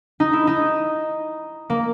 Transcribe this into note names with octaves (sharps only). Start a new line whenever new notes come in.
D#4
E4
D#4
A#3